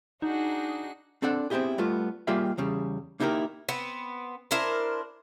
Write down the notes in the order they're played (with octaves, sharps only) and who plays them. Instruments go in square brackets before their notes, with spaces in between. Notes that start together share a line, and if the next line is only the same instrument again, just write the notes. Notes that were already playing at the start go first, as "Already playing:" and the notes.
[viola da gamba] D4 F#4 G#4 [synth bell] D#4
[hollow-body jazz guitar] C4 D4 A4 D5 F#5
B3 C4 D#4 E4 G4 G#4
G3 A3 B3 F4
G3 A#3 F4 G4 G#4 E5
E2 C#3 G3
A#3 D#4 E4 G4 A4 A#4
[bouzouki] B3 C4
D4 E4 A#4 C5